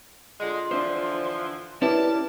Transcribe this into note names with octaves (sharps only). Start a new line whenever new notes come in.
D3 G#3 F4
D3 E3 F3 D4 C5
C#4 E4 G4 A#4 B4 D5 A5